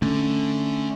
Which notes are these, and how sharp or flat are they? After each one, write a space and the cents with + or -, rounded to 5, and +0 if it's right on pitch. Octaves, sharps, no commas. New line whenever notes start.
D3 +0 A3 -5 C#4 +0